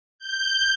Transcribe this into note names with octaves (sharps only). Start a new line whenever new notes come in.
G6